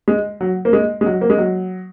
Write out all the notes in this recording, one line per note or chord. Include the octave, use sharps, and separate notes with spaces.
G#3
F#3
A#3
G#3
G#3
F#3
A#3
G#3
F#3